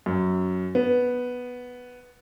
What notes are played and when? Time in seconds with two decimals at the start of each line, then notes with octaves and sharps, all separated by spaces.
0.06 F#2
0.75 B3